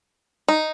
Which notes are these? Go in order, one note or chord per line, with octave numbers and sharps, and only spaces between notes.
D#4